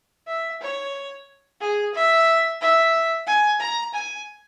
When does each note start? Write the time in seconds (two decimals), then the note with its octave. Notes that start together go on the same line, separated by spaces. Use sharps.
0.27 E5
0.61 C#5
1.60 G#4
1.94 E5
2.61 E5
3.26 G#5
3.60 A#5
3.93 G#5